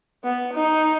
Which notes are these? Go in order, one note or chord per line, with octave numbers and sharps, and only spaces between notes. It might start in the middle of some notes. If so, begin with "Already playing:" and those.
B3
D#4